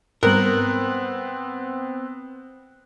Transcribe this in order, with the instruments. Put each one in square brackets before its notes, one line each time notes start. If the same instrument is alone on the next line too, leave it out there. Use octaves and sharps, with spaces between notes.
[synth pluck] G#2 G3 [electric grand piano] B3 C4 [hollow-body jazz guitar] A#4 [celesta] F#6 F#7